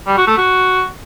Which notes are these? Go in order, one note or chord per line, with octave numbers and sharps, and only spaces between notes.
G3
F#4
A3
F#4